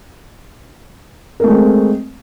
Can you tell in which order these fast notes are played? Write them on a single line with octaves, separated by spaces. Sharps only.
A#4 A3 G#3 C4